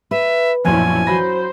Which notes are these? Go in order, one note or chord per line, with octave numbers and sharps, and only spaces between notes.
B4 E5
A#1 F#2 B2 F3 C#4 E4 D5 G#5
F#3 C5 B5 A#6